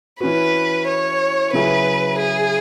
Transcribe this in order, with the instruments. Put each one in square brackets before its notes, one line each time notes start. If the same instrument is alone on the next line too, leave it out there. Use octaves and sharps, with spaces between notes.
[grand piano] E3 C#4 F#4 [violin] B4
[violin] C#5
[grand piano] C#3 F#3 E4 G#4 [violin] B4
[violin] G#4